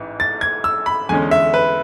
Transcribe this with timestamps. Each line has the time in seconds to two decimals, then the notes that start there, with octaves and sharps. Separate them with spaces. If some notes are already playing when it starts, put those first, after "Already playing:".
Already playing: A1 G#2 E3
0.20 A6
0.41 G#6
0.64 E6
0.86 B5
1.09 E2 D3 G#3 C#4 G#5
1.31 E5
1.54 B4